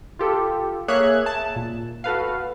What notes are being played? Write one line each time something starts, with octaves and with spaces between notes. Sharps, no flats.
F4 G4 A4
A#3 G#4 C#5 E5 F#6 G#6
A5
A#2
F#4 A4 B4 F5